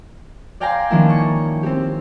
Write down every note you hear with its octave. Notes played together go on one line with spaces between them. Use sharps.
D5 F5 G5 G#5 A#5 C6
D#3 F3 A#3 C#4 D4 E4
C#6 C#7
C4 G4